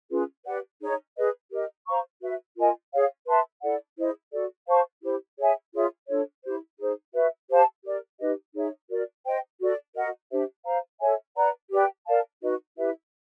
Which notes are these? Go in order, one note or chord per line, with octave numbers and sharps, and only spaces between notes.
C#4 F4 G#4 B4
G4 B4 D5 F#5
D#4 G#4 C#5
G#4 B4 D#5
G4 A#4 D#5
C5 F5 A#5 C#6
F#4 B4 E5
F4 A#4 D#5 G#5
G#4 C#5 F5
B4 E5 A5 C6
E4 A4 D5 F#5
E4 G#4 C5 D#5
F#4 A4 D5
C5 F5 A5 C#6
E4 G4 C5
G#4 C#5 E5 G#5
F4 G#4 C#5 E5
D4 F4 A4 C#5
E4 G4 C5
D#4 G#4 C5
F#4 B4 E5
G4 C5 F5 A5
G4 A#4 D5
D#4 G4 B4 D#5
D#4 G#4 C#5 E5
F#4 A#4 D5
C5 D#5 G5
F#4 A4 D5
F#4 A#4 D#5 F#5
D4 G4 C5 E5
C5 F5 A#5
A4 C#5 E5 G#5
B4 D5 F#5 A#5
G4 B4 D5 G5
A#4 D5 F5 A5
D#4 F#4 B4 D#5
E4 G4 B4 E5